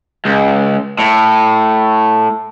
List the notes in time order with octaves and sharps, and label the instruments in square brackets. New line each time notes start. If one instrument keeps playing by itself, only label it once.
[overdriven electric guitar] C#2
A2